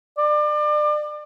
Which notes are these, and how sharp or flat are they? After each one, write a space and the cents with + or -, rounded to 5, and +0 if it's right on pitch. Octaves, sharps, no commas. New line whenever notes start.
D5 +30